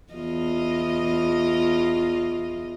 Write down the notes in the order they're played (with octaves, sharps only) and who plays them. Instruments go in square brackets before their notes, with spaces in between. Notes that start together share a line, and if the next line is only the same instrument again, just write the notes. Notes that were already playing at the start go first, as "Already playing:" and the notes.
[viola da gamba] E2 F4 D#5